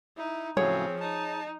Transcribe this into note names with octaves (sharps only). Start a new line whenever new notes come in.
D#4 E4
A2 C#3 F3 F#3 C4 G#4 C#5
D#4 A5